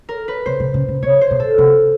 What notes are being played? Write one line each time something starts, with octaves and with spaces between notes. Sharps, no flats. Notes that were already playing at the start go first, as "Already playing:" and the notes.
A#4
B4
C3 C5
C3
C#3
C#3
C3 C#5
C5
B2
A4
C3